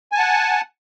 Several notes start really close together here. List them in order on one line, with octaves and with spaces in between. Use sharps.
G#5 A5 F#5